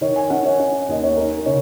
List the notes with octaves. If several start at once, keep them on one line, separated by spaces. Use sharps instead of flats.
D#3 C#5
G#5
C#4 F#5
C#5
C#4 C#5
D#2 D#5
C#5
D#4 A#4
C#3 C#5